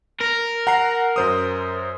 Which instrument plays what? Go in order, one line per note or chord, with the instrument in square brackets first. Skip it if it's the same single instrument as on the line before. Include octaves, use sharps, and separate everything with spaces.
[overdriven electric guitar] A#4
[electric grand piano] F#5 A#5 C7
F#2 C5 D#6